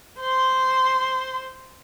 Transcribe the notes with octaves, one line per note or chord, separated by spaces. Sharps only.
C5 C6